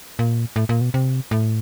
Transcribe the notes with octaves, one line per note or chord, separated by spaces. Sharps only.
A#2
A2
A#2
B2
C3
A2